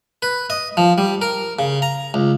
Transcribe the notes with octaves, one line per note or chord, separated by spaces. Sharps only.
B4
D#5
F3
G3
A#4
C#3
A#5
C#2